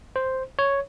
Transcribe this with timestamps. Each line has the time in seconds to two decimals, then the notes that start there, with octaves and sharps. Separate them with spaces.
0.16 C5
0.59 C#5